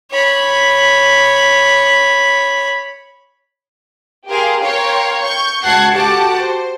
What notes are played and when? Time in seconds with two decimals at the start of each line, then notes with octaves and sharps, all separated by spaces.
0.11 C#5 B5
4.28 G4 G#4 A#4 F5 C6
4.62 A#4 C#5 F5 G5 A#5 C6
5.23 C#6 G6
5.64 C#2 F#4 F#5 A5 G#6 C7
5.94 F#4 G4 A4 F#5 A5 D6
6.37 C5